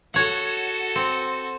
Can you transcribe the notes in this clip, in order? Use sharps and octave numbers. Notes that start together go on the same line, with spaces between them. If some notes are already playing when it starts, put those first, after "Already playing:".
F#4 A4 C#5 F#5
C4